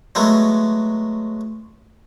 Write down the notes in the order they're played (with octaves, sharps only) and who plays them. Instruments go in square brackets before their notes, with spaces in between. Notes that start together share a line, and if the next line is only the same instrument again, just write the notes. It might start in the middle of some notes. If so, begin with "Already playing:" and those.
[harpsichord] F#3 G#3 A3 B3